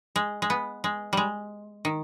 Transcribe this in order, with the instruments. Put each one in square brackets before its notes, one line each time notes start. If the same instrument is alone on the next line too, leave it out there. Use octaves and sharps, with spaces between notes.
[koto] G#3
G#3
B3
G#3
G3 G#3
D#3